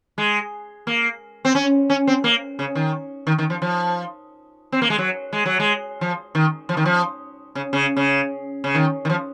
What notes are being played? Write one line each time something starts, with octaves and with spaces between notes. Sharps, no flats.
G#3
A#3
C4
C#4
C#4
C4
A#3
C#3
D#3
D#3
D#3
F3
F3
C4
A#3
G#3
F#3
G#3
F#3
G#3
F3
D#3
F3
D#3
F3
C#3
C#3
C#3
C#3
D#3
D#3
F3